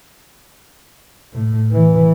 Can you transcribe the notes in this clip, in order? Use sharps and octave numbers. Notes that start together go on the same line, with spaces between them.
A2
E3